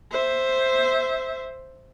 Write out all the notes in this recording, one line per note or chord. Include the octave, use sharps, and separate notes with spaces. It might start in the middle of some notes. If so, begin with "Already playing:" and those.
C5 E5